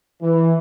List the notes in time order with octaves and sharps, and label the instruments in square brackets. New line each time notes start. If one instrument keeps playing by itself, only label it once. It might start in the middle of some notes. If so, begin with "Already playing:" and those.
[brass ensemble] E3